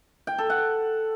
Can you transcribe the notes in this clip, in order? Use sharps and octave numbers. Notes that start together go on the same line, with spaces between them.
G5
A4
F#5